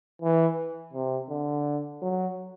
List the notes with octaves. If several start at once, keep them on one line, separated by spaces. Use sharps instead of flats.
E3
C3
D3
F#3